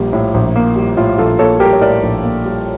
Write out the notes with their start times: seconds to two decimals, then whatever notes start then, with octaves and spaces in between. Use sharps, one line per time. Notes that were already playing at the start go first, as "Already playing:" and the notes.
Already playing: A#1 G3 A#3
0.13 A2
0.34 A#1
0.56 A#3
0.76 G3
0.97 A2 F4
1.18 A#1 F4 A4
1.39 A#3 A4 C#5
1.60 G3 G4 A#4
1.73 C#5
1.81 A2 A#4 D5
2.03 A#1
2.23 A#3
2.45 G3